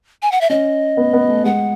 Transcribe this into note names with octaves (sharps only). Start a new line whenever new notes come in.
G#5
F#5
E5
C#4 D#5
B3
B3
A3
G#3 F#5